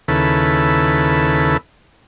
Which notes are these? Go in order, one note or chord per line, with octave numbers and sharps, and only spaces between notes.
D#2 C#3 E4 A4 B4